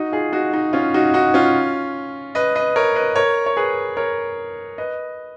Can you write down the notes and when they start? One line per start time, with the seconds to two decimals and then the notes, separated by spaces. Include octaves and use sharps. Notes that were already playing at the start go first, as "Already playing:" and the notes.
Already playing: D#4 F#4
0.12 F4 G#4
0.32 D#4 F#4
0.53 D#4
0.73 C#4 F4
0.94 D#4 F#4
1.14 D#4 F#4
1.34 C#4 F4
2.35 B4 D#5
2.56 B4 D#5
2.76 A#4 C#5
2.96 B4 D#5
3.16 A#4 C#5
3.46 C#5
3.57 G#4 B4
3.97 A#4 C#5
4.78 B4 D#5